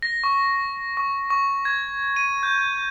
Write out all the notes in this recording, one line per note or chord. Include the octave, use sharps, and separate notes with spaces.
A#6
C#6
C#6
C#6
G#6
D#7
G6